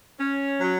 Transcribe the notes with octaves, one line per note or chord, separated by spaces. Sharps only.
C#4
F#3